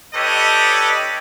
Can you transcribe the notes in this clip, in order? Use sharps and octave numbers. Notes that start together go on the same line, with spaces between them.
D4 G4 A4 B4 C#5 D#5